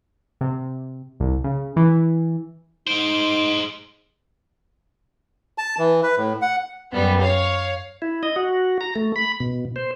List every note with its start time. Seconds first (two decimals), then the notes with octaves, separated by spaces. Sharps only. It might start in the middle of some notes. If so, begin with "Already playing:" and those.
0.41 C3
1.20 C2
1.44 C#3
1.76 E3
2.87 G#3 D#4 C5 D7
5.58 A5
5.78 E3
6.03 B4
6.18 A2
6.42 F#5
6.92 F#2 G3 B3
7.21 C#5 F5
8.02 E4
8.23 D#5
8.36 F#4
8.81 A#5
8.96 A3
9.16 B5
9.40 B2
9.76 C5